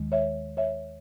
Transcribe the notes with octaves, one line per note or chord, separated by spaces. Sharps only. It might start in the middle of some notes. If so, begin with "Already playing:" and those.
Already playing: D#2 D#3 G#3
C#5 E5
C#5 E5